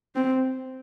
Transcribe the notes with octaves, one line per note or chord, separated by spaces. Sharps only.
C4